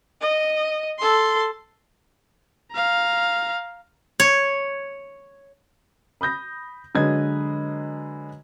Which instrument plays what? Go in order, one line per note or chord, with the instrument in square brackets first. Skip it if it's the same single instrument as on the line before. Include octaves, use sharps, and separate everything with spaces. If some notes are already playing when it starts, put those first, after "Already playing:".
[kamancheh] D#5
A4 C6
[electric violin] F5 A#5
[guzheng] C#5
[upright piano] B5 D#6 G6 A#6
D3 F#3 G#3 B4 D#5 G#6